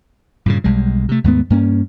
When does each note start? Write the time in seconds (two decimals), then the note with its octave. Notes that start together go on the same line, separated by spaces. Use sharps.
0.46 G2 A#2 C#3
0.64 B1 G3 G#3
1.09 C3 A3
1.24 D#2 G#2 A3 B3
1.50 G2 A#3 C#4